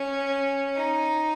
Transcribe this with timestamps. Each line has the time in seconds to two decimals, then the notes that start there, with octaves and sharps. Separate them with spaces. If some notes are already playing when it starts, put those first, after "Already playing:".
Already playing: C#4
0.75 D#4